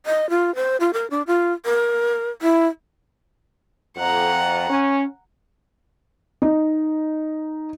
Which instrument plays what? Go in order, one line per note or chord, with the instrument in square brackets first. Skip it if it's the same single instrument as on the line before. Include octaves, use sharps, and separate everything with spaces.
[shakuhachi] D#5
F4
C5
F4
A#4
D4
F4
A#4
E4
[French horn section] F2 [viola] F#5 A#5
[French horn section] C#4
[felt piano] D#4